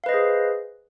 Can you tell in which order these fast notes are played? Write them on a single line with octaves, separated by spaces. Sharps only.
F5 B4 D#5 C5 G#4